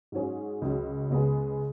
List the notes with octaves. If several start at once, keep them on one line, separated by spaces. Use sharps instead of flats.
G#2 F#3 C#4 G#4
C#2 C#3 F#3
C#2 C#3 G#3 B3 G#4